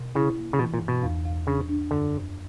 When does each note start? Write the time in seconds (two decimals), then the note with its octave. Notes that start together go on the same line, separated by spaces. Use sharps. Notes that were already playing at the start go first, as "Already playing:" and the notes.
Already playing: B2
0.15 C#3 E4
0.38 A#3
0.53 C#3
0.58 B2 E3
0.74 A#2
0.81 G2
0.88 B2
1.02 E2
1.25 E2
1.47 C#3 D4
1.69 D4
1.91 F#2 D3
2.13 F#2